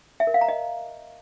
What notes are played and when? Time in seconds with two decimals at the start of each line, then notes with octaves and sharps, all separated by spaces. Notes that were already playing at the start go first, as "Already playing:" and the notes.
0.20 E5
0.27 A#4
0.34 F5
0.41 A#5
0.48 D#5